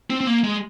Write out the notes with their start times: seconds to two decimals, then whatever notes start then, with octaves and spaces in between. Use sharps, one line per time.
0.10 C4
0.21 C4
0.27 A#3
0.44 G#3